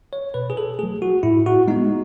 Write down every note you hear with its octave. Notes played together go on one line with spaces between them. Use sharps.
C#5
B2 B4
G#4
A4
F#3 A3 G#4
F#4
A2 E4
F#4
G#3 B3 D#4